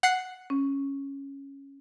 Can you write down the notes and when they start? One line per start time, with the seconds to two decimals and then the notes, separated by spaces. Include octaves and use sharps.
0.03 F#5 F#6 C7
0.50 C#4